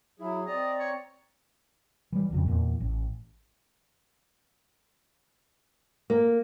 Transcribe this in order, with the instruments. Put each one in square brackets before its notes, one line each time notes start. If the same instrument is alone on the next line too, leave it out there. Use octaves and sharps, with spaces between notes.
[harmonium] F#3 G#4 [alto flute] E4
[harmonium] C4 A#5 [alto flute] D5 [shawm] D#5
[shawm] C#5
[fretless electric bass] E3 G3
E1 F2 C#3
E2 A#2
A1
[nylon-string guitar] A#3